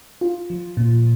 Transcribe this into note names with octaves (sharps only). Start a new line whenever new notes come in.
F4
F3
A#2